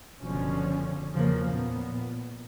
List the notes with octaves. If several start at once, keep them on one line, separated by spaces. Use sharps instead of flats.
F#1 B2 D3 F3 C#4
E2 C#3 F3 F#3 A#3
A#2 B3